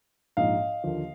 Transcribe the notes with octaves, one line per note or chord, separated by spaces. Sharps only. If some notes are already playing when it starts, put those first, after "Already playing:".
A#1 G#2 F3 D#5 F5
D#2 D3 F3 A#3